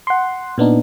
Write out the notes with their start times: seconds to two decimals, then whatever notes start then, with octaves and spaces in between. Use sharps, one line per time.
0.07 F#5 C6
0.58 A#2 B3 D4 D#4